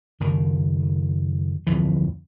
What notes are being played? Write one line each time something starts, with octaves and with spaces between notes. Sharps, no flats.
F#1 D#3
D1 F2 E3